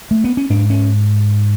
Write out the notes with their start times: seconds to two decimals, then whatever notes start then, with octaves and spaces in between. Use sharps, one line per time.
0.11 A3
0.24 B3
0.37 C#4
0.50 G#2 D4
0.70 C#4